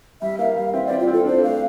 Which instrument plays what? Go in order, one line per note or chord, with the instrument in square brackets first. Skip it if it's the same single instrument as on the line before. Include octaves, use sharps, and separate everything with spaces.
[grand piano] G3 [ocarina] E5
[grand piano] A#3 [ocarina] F5
[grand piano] G3 [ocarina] F5
[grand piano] C4 [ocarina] E5
[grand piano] C4 [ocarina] D5
[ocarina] F4
[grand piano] C4
[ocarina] A4
[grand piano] D4 [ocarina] C5
[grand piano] A3 [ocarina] F5